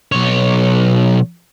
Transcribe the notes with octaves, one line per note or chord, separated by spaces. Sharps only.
B1 C#5